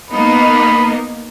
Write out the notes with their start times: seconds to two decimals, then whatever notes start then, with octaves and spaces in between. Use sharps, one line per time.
0.11 A#3 B3 D#4 B5